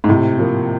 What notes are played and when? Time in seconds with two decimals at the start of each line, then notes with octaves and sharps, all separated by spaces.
0.04 G#2
0.09 A2 C3
0.39 F3 A#3